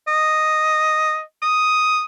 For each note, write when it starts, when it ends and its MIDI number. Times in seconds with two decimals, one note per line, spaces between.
0.08 1.22 75
1.43 2.04 87